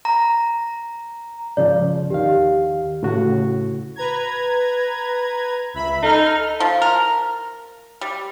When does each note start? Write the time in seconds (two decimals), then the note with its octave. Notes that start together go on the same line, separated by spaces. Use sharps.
0.05 A#5
1.57 G#2 C#3 F3 D5
2.10 D#2 D#3 G4 F5
3.03 A2 C#3 F#4
3.96 B4 A#5 G#6
5.74 C#2 E5 B5
6.03 D#4 A4 F6
6.60 F3
6.82 A#4
8.01 G3